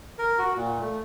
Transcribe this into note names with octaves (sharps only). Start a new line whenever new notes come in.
A#4
F#4
A#2
A3